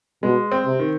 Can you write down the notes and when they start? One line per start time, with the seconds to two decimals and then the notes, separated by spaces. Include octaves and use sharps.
0.23 B2 G#3
0.52 C4
0.66 C3
0.80 D#3